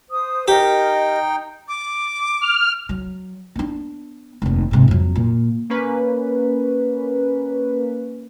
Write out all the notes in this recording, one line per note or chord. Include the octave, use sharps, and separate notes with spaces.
C5 D#6
D#4 G4 A#4 D#5 G5
D6
F6
F#3
B3 D4
F1 D#2
G#2 C3
F2 F#3
A#2
A#3 C#4 B4